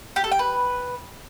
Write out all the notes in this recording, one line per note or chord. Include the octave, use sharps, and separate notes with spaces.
G4
A4
G5
B4